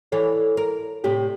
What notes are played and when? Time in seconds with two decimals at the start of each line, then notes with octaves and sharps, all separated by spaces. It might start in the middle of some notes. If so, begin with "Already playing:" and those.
0.12 E3 A4 C#5
0.57 A#4
1.04 A2 C3 G4